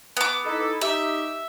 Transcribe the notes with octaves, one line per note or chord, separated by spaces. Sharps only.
B3 D6
D#4 E4 A4
D#4 G4 E5